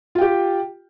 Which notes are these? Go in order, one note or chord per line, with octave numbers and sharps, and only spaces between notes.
F4 G4 G5